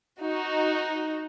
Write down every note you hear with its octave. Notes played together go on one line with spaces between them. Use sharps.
D#4 F#4